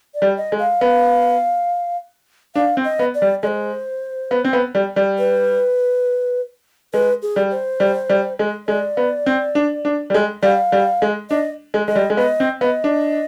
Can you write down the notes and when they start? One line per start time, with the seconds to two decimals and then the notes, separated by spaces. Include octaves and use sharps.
0.15 D5
0.22 G3
0.37 D#5
0.52 G#3
0.59 F5
0.81 B3
2.55 D4 F5
2.77 C4
2.84 D#5
2.99 B3
3.15 D5
3.22 G3
3.43 G#3 C5 D5
4.31 B3
4.44 C4
4.53 B3
4.75 G3
4.96 G3
5.19 B4
6.93 G#3 B4
7.22 G#4
7.36 G3
7.51 C5
7.80 G3
8.09 G3
8.39 G#3
8.67 G#3 D5
8.97 B3
9.26 C4
9.55 D4
9.85 D4
10.10 G3
10.14 G#3
10.43 G3 F5
10.72 G3
11.02 G#3
11.30 D4 D#5
11.74 G#3
11.88 G#3 D#5
11.95 G3
12.10 G#3
12.17 B3 D#5
12.40 C4
12.61 B3 D#5
12.84 D4